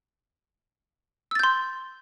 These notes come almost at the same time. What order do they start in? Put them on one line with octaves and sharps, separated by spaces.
E6 A6 G6 C6